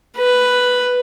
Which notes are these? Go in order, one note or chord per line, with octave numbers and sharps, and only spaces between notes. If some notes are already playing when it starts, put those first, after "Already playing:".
B4